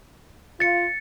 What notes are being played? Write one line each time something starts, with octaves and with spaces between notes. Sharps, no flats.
F4 A6 C#7